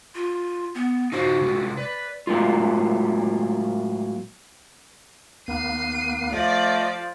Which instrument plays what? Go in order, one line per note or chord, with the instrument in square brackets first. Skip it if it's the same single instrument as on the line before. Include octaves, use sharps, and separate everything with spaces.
[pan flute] F4
B3
[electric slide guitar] D#4 F4 C5 [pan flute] F#4
[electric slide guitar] C3 G#3 F4
[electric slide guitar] B4 [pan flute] D5
[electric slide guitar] A2 F#3 G#3 A#3 F4
[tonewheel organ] D#2 A#3 B3 [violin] C7 D#7
[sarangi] F3 [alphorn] A3 [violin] D5 [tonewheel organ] D#5